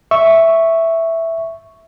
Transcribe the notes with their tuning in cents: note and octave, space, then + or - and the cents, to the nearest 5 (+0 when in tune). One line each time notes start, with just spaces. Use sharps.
E5 +0 C#6 +0